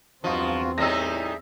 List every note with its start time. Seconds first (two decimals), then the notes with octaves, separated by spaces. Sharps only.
0.24 E2 G2 F3 C4 D#4 F4 F#4
0.78 A2 G3 D#4 G#4 E5 E6 A#6